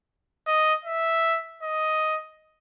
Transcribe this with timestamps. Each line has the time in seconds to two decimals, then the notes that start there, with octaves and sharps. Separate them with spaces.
0.47 D#5
0.85 E5
1.63 D#5